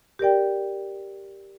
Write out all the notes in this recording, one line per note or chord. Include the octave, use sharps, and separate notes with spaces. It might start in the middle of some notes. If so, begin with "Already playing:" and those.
G4 A#4 D5 G5